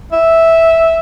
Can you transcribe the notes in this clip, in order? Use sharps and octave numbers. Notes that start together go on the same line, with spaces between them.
E5